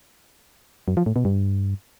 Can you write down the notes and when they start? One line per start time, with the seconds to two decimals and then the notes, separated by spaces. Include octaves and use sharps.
0.88 F#2
0.97 F3
1.06 A2
1.16 B2
1.25 G2